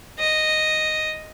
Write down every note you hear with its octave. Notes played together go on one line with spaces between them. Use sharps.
D#5